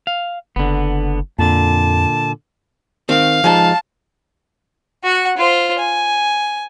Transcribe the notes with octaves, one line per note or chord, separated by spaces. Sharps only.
F5
F#1 D3 B3
F2 A#2 D3 A5
D#3 C4 F5
F3 G#3 D#4 A5
F#4 F#5
F4 C5
G#5